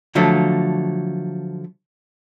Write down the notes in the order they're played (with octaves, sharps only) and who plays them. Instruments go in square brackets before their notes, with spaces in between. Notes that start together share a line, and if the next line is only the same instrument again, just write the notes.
[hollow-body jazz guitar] D3 F3 F#3 A3